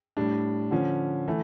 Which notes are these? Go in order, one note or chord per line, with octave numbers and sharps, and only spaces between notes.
A2 G3 D4
D3 F3 C#4
E3 A3